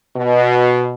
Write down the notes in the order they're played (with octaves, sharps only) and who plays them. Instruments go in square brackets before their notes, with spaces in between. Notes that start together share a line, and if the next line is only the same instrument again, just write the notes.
[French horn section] B2